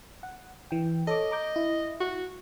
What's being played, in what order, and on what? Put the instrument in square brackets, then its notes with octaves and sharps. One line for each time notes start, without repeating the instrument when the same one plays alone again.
[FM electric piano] F#5
E3 G5
[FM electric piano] A4 C#5 D6 [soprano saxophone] D#5
[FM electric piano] A#5 D6 G6
E4
[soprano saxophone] F#4